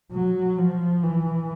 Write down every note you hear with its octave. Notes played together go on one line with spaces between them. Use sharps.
F#3
F3
E3